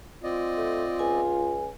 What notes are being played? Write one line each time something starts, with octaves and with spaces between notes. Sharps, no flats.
C4 F4 D5 D#5
A3
C#2 G#5